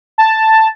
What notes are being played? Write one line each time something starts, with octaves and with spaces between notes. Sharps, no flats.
A5